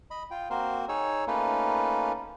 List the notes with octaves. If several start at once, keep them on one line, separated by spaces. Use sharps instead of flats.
D#5 B5
F4 G5
A#3 C4 F#4 A#4 C5
D#4 G#4 C#5 E6
A3 A#3 C#4 D#4 F4 B4